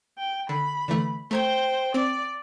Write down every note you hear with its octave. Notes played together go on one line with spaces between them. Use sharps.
G5
D3 B5
D3 E3 A3
A3 C5 G5 A#5 G#6
C4 D5 D7